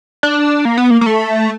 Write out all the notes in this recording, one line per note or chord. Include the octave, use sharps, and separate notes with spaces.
D4
A#3
B3
A#3
A#3
A3